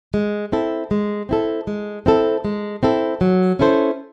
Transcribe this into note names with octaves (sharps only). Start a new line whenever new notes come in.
G#3
C4 E4 A4
G#3
C4 E4 A4
G#3
C4 E4 A4
G#3
C4 E4 A4
F#3
C#4 E4 A4 C5